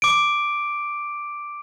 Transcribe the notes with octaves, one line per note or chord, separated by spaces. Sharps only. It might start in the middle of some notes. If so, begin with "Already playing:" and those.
D6 D7